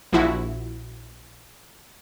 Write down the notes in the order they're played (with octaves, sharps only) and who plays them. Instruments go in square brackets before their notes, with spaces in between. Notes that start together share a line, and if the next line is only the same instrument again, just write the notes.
[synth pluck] A#1 F3 E4 F#4